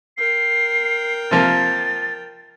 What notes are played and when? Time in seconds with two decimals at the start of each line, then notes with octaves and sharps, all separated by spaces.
0.18 A#4 G5 C7
1.31 C3 F3 A#3 A6